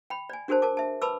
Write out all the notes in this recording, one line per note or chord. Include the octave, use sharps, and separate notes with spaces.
G5 B5
D5 G#5
D4 F#4 G#4 A#4 C5 A5
A#4 A5 D6
E5 A5
B4 A5 B5 D6 E6